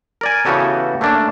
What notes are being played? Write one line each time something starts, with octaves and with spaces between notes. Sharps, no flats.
A#4 D5 G#5
C#3 E3 B3 F#4 G4 A4
A3 A#3 C#4 D4